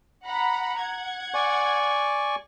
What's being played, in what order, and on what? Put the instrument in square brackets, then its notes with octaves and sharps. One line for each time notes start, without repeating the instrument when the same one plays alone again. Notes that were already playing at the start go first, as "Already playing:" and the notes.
[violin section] F#5 A#5 B5
F#5 G#6
[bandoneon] D5 G#5 C#6